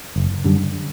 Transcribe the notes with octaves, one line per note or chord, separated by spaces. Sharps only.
F#1
F#2 D3 G3